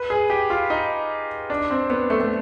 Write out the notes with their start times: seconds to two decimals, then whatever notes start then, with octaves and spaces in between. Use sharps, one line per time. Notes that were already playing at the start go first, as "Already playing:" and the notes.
Already playing: B4
0.10 G#4
0.30 G4
0.50 F4
0.70 D#4
1.50 D4
1.71 C4
1.90 B3
2.10 A3
2.21 A3